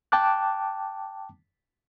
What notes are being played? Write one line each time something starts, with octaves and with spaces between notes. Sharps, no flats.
G5 A5 D6 F#6